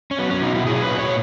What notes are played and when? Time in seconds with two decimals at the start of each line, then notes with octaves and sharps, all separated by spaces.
0.11 C#4
0.19 F#3 B3
0.31 C#4
0.43 B2 D#4
0.55 E4
0.66 F#3 G#4
0.82 B4
0.90 A#2
0.99 C#5